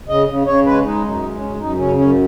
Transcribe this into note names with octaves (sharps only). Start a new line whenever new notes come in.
C#3 D#5
C#3
C#3 C#5
G#3 B4
G#3 D#4
F#2
D#4
G#3
C#4
F#2
F#2 D#4
C#3 C#4
F#2 C#4